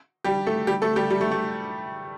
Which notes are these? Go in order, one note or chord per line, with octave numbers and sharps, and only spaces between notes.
G3 G4
A3 A4
G3 G4
A3 A4
G3 G4
G3
A3
A3